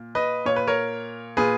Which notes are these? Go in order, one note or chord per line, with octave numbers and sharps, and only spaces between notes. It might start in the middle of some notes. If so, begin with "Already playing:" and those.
Already playing: A#2
B4 D#5
A#2 C#5
B4
A#4 C#5
A#2 G#4 B4